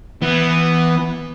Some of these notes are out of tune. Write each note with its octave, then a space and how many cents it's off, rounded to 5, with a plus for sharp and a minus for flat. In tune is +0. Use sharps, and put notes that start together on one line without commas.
E3 +0 B3 +0